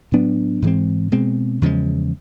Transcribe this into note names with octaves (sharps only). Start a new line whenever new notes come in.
A2 F#3 B3 D4
G#2 E3 G#3 C4
B2 G#3 C4
E2 C#3 F3 G#3